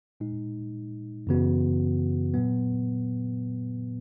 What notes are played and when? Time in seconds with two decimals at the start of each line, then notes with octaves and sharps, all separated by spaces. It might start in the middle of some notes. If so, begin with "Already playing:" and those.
0.20 A#2 G#3 D#4
1.27 F#2 C#3 E3 B3 F#4
2.34 A#2 F#3 B3